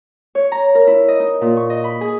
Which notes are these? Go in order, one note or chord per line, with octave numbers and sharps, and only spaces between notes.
C#5
A#5
A#4
E4
D#5
D#4
A#2
C#6
D#5
B5
G#4